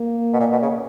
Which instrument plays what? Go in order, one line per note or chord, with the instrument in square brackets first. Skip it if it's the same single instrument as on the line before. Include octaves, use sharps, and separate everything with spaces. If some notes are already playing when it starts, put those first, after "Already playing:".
Already playing: [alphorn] A#3
[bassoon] B2
A#2
B2
C#3